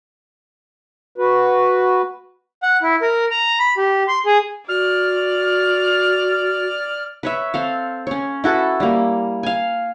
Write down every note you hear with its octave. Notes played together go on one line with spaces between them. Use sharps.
F#4 B4
F#5
E4
A#4
A#5
B5
G4
C6
G#4
F#4 D5 F6
B4 C#5 E5
C4 A4 F5
C#4 C#5
E4 F#4 A4 B4
G3 A#3
F5 G#5